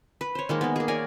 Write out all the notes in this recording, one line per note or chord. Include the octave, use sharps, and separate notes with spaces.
B4
C5 C#5
D#3 G#3 A#3
A#3 B3
A#3 G#4
A#4 C#5 D5 G#5